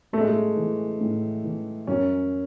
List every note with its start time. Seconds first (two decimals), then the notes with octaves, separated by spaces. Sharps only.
0.13 A2 A3
0.21 G#3
0.29 A3
0.56 E3
1.01 A2
1.44 E3
1.87 F#2 C#4